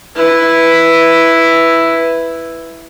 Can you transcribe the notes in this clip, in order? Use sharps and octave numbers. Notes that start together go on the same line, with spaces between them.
E4 B4